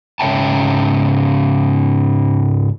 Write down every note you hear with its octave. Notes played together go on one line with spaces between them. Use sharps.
G#2 C#3 C#5 E5 G5 A5